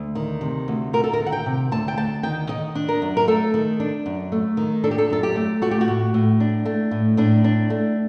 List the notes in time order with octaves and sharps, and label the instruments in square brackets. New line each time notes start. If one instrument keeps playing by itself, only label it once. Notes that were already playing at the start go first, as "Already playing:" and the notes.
Already playing: [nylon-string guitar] D2
D#3
C3
D2
D2 A#4
A4
A#4
D#3
F#5
G5
C3
D2 A5
G5
D2 A5
D#3 G5
D#3 D#5
D4
A#4
F#2
A#4
A3 A4
D#3
D4
F#2
A3
D#3
D4 A4
G4
A4
F#2 A4
G4
A3
A3 F#4
G4
F#4
A2
A2
D4
A3
A2
A2 D4
D4
A3